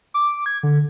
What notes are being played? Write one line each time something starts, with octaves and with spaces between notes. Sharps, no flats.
D6
G#6
D3